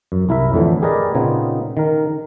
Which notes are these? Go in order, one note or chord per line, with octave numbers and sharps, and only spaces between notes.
F#2
C2 E4 A#4 E5
F2 A2 D3 E3
G4 G#4 A#4 B4 D5 D#5
A#2 C#3 B3 C4 D#4
D#3 A#4